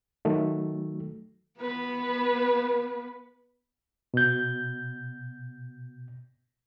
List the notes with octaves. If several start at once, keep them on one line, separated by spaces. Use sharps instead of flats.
D#3 F#3 A3
B3 B4
B2 G6